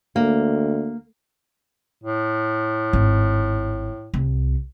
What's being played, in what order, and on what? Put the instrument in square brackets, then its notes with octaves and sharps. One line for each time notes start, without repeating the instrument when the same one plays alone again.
[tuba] D2 [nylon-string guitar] A#3
[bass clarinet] A2
[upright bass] G#1
C2